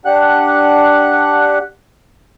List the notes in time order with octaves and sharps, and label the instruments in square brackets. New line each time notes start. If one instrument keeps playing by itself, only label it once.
[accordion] D4 G4 F#5 F#6